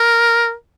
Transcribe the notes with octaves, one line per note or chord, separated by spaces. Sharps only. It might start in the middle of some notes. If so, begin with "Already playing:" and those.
Already playing: A#4